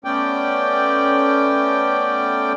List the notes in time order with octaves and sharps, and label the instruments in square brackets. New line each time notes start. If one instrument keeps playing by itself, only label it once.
[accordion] A3 B3 C#4 D5 G5